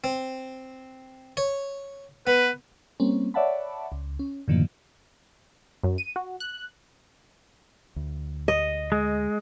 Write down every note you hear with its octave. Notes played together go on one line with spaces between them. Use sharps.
C4
C#5
B3 B4
G3 A#3 C4 C#4
C#5 D5 E5 F#5 A5 B5
C#2
C#4
F#2 A2 D3 D#3 F3 A#3
F#2
D#7
F#4
F#6
D2
D#5
G#3